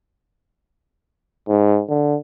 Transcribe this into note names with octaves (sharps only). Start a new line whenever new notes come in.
G#2
D3